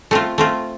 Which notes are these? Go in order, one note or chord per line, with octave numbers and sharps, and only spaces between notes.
A3 C4 F4
A3 C4 F4